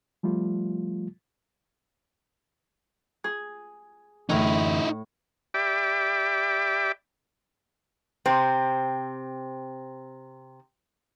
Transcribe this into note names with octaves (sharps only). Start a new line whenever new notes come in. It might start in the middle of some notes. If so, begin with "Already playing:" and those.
F3 G3 A3 F4
G#4
F#2 A2 D3 E3 D#4 E4
G4 D5 E5 G5 B5 D6
C3 C4